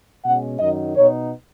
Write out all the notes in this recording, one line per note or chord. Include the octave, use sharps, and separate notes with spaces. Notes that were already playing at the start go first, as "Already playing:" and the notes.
B2 G#3 C#4 F#5
F#2 D#3 F#3 D#4 D#5
B2 B3 D#4 C#5